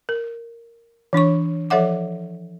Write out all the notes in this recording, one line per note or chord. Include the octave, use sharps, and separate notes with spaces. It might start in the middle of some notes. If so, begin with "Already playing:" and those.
A#4
E3 D4 C#5 C#6
F3 A4 C#5 E5 F#5 D6